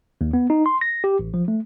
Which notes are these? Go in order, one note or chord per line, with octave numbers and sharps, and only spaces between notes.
D#2
B3
D#4
C6
A#6
G4
A1
F3
A3